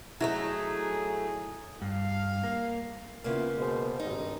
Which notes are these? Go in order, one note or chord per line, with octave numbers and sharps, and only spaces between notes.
F#3 A3 D#4 E4 G#4
G2 F5
A#3
C#3 A#3 B3 E4 F4
B2 G#3 C5
G#1 G2 D#4